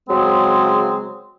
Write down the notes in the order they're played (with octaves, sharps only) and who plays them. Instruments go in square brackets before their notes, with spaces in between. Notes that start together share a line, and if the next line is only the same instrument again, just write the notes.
[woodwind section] C#3 F#3 G#3 C4